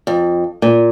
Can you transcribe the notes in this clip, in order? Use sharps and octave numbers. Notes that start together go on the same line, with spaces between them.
F2
A#2